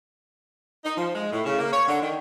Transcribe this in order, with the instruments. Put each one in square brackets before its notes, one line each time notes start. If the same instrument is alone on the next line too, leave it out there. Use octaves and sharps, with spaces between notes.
[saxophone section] D#4
F3
G#3
A2
C#3
A#3
C#5
D3
D#3